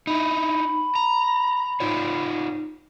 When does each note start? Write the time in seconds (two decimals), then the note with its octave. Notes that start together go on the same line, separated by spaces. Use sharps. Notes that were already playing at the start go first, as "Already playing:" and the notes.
0.07 D#4 E4 B5
0.96 A#5
1.80 D#4 F4 C#5